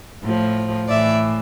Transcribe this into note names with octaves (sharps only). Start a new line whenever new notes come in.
A2 F3
A2 E3 D5 E5